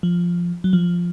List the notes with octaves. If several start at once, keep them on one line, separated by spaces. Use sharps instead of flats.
F3
F#3
F3